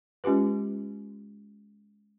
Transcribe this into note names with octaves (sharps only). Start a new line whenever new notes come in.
G#3 C#4 F4 G4 B4